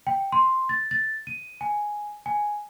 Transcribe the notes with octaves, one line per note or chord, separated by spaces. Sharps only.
G5
C6
A6
A6
D#7
G#5
G#5